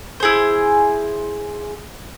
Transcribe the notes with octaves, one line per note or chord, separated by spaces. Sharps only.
E4 G#4 C5